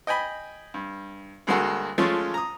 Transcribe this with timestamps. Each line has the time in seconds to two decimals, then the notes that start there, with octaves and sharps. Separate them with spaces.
0.07 D#5 G5 G#5 B5
0.74 G2
1.47 D2 G2 G#3 A#3 F#4 A4
1.98 F3 G#3 A3 C#4 F4
2.34 A#5 D#6